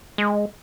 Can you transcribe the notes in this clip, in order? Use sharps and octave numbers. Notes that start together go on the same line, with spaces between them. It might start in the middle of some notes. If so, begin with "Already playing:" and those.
G#3